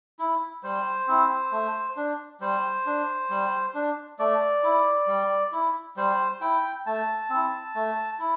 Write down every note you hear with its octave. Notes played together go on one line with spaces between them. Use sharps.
E4
G3 C5
C4 E4
A3
D4
G3 C5
D4
G3
D4
A3 D5
E4
G3
E4
G3 C5
E4 G5
A3 A5
C4 E4
A3
E4